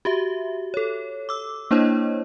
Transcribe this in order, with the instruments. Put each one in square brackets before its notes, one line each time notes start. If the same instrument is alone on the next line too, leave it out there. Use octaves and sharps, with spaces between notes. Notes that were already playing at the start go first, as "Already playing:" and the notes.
[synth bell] F#4 G4 E5
A4 C#5
D6 E6
A#3 D4 E4 C5 C#5 D#5